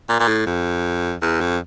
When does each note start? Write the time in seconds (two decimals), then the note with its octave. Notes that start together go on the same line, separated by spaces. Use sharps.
0.09 A#2
0.20 A#2
0.28 A2
0.46 F2
1.22 E2
1.41 F2